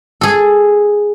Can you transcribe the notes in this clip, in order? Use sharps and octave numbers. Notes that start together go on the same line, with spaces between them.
G#4 A4